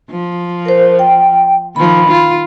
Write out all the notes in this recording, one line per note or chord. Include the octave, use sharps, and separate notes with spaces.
F3
A#4 C5
G5
D#3 F3 B5
F4